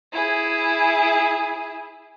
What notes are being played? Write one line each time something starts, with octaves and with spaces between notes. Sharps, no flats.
E4 G#4